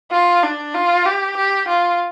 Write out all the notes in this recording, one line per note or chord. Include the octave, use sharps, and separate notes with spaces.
F4
D4
F4
G4
G4
F4